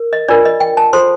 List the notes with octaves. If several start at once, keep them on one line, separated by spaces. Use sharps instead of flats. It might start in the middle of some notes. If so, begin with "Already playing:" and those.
Already playing: A#4
D#5
D4 F4 A#4 D5
D#5
G5
A5
F4 A4 C5 C6